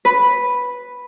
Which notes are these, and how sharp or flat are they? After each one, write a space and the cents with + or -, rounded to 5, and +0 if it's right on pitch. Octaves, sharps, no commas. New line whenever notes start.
B4 -5